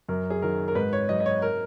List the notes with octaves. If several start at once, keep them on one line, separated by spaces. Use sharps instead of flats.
F#2 A#4
G#4
D#3 F#3 A#4
A#4
G#2 B4
C#5
F#3 D#5
D#5
C#5
A#4